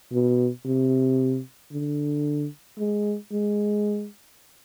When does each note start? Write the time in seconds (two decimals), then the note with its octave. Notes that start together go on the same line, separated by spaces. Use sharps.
0.12 B2
0.65 C3
1.72 D3
2.78 G#3
3.32 G#3